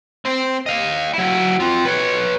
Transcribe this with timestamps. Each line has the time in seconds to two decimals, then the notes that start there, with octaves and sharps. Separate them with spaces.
0.25 C4 C5
0.66 D#5 F5
1.14 F#3 E4
1.60 C4 F4
1.85 B4 C#5